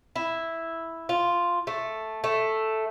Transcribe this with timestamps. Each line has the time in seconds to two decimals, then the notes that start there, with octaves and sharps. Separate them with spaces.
0.16 E4
1.09 F4
1.67 A3
2.24 A3